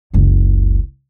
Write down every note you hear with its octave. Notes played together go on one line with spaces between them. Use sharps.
F#1 C#2